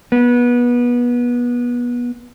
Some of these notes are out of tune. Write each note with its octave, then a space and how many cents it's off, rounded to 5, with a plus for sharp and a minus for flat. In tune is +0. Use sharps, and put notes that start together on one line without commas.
B3 -25